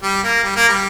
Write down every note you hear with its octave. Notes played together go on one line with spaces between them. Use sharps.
G3
A#3
G3
A#3
G3